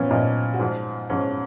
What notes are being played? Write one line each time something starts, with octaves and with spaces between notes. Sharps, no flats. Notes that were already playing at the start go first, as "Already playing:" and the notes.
Already playing: A#2 F3 B3 C#4
A#2 F3 D#4
F#4
G#2 F3 F4
G#2 F3 C#4